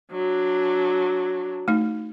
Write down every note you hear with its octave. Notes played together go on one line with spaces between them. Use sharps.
F#3 D4
A3 D#4